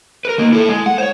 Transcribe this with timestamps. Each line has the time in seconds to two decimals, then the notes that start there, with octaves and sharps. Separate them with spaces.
0.25 A#4 B4
0.38 D#3 A#3
0.52 E4 A4
0.69 G#3
0.86 F#5
0.98 C5 C#5